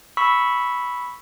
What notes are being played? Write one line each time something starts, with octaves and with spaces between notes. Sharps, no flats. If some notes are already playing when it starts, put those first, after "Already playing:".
B5 C#6 E6 B6